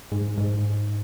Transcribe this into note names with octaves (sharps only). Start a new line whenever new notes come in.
G#2
G#2